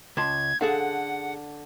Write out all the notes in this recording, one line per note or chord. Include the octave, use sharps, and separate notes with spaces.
C#2 A5 C6 G#6
D3 G#4 A4 F5 F#5